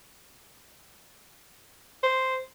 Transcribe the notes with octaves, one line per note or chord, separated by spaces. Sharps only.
C5